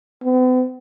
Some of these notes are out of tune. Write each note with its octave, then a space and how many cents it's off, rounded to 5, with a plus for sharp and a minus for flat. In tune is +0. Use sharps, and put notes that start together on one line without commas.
B3 +45